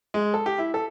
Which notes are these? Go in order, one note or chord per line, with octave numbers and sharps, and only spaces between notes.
G#3
A4
G4
E4
A4